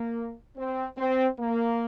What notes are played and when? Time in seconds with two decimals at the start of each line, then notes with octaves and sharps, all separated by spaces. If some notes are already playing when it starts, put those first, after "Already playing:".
Already playing: A#3
0.56 C4
0.98 C4
1.39 A#3